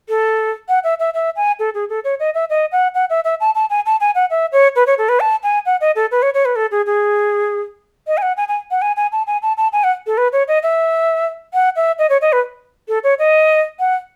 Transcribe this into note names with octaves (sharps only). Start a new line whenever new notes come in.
A4
F#5
E5
E5
E5
G#5
A4
G#4
A4
C#5
D#5
E5
D#5
F#5
F#5
E5
E5
A5
A5
G#5
A5
G#5
F#5
E5
C#5
B4
C#5
A4
B4
A5
G#5
F#5
D#5
A4
B4
C#5
C#5
B4
A4
G#4
G#4
D#5
G#5
F#5
G#5
G#5
F#5
G#5
G#5
A5
G#5
A5
A5
G#5
F#5
A4
B4
C#5
D#5
E5
F#5
E5
D#5
C#5
D#5
B4
A4
C#5
D#5
F#5